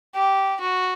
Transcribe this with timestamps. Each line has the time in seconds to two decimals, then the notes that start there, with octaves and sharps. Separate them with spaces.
0.15 G4
0.60 F#4